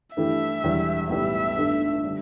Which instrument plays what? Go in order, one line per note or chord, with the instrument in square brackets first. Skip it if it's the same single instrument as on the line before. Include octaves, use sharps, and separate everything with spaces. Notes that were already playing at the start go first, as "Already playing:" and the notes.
[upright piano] G2 E3 A3 E4 G4 [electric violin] E5
[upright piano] E1 E2 E3 G3 D4
[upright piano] B1 A2 G3 B3 G4 [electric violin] E5
[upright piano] G1 G2 D3 A3 G4
D3 G3 D4